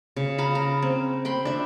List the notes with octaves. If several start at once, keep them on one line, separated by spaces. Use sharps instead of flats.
C#3
F5 A#5 B5
A#5
C4
G5 B5 C6
D4 E5